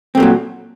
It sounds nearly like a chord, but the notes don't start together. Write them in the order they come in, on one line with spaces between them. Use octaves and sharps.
C4 A3 A#2 F#3